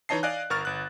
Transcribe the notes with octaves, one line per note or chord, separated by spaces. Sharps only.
E3 D#4 C#5 D#5 A5 C7
D5 D#5 F5 G#5 F#6
G1 A#4 C#6 F6 A6
G1 F#6